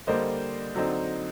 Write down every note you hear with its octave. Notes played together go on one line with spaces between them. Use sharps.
D3 G3 A#3 C5 D#5
D3 F#3 C4 D#4